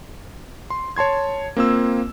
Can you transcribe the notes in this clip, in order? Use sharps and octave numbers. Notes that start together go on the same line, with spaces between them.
C6
C#5 A5 C6 G#6
A#3 C4 F4 E6